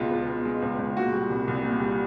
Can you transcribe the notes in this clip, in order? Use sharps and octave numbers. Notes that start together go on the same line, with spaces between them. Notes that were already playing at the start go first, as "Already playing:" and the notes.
Already playing: C#2 B2 G#3 F4
C#2
B2
G#3
C#2
C#2
A#2 F#4
G3
C2
C2
A#2
G3